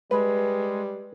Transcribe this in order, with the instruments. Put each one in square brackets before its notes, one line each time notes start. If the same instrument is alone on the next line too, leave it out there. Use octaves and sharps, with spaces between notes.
[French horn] G3 [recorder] G#3 [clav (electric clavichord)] B4